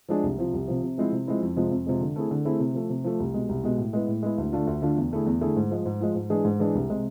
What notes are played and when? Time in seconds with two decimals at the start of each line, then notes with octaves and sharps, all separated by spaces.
0.09 F3 G#3 D4 G#4
0.23 C2
0.38 C3 F3
0.53 C2
0.68 C3 F3
0.83 C3
0.98 F3 G#3 C4 E4
1.12 C3
1.27 F3 G#3 C4 E4
1.42 F2
1.56 C3 F3 G#3
1.72 F2
1.86 C3 F3 G#3
2.00 D3
2.16 A3 C4 E4 G#4
2.31 D3
2.45 A3 C4 E4 G#4
2.60 C3
2.75 F3 A3
2.90 C3
3.04 F3 A3
3.20 C2
3.34 B2 G#3
3.49 C2
3.64 B2 G#3
3.78 A2
3.93 G#3 B3 E4 G#4
4.08 A2
4.23 G#3 B3 E4 G#4
4.38 D2
4.52 D3 A3 D4 F4
4.67 D2
4.82 D3 A3 D4 F4
4.97 E2
5.11 D3 A3 E4 G#4
5.26 E2
5.41 D3 A3 E4 G#4
5.56 G#2
5.71 F3 G#3
5.86 G#2
6.01 F3 G#3
6.15 G#2
6.30 E3 G#3 D4 G#4
6.45 G#2
6.60 E3 G#3 D4 G#4
6.75 C2
6.90 C3 G#3